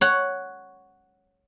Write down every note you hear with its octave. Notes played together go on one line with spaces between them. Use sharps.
C#5 F#5